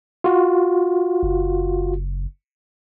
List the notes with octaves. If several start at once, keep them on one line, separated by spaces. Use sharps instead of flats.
F4 F#4
F#1